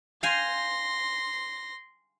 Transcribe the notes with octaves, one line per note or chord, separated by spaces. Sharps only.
F5 G5 G#5 C6 A#6